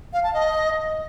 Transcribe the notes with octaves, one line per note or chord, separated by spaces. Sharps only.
F5
A5
D#5